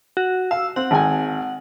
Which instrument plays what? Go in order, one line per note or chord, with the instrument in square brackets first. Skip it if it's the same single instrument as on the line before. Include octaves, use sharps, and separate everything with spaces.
[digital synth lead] F#4
[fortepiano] F5 [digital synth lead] E6
[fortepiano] C4 [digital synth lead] F#5
[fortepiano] G#1 G5 G#5